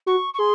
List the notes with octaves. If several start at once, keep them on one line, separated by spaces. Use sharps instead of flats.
F#4 C#6
C#6
G#4 C6